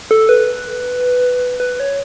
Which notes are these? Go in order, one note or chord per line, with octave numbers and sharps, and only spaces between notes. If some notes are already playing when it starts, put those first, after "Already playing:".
A4
B4
B4
C#5